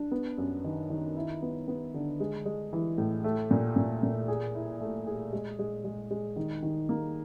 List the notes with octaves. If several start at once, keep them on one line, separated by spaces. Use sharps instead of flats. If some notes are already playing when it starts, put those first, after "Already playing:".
Already playing: D4
B3
F#2
D#3
D#3
E4
B3
B3
D3
G#3
G#3
E3
A2
A3
A#2
A#2
A#2
G#4
E4
A3
G#4
G#3
G#3
G#3
G#3
D#3
D#3
A#3